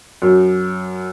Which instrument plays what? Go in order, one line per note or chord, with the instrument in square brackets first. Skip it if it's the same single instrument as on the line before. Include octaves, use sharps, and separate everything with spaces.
[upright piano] F#2